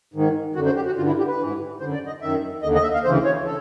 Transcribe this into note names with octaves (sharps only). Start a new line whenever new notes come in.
G#2 D#3
F#2 D3 F#4
C5
G4
F#4
G2 D3 F4
E4
G4
B4
G#2 E3
F#2 D3 C5
D5
D#5
F#2 D#3 E5
D#2 D3 D#5
D#5
E5
F5
D2 C#3 E3 C5
C#5
A4